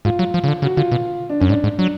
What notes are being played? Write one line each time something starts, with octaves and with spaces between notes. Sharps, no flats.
G#2 F4
F#3
F3
C#3
D3
C#3 F#4
D3 F4
B2
D4
F#2 C#4
G#2 D4
G#2
F#3 D4